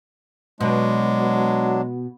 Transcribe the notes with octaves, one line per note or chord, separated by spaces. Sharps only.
B2 F#3 G#3 D4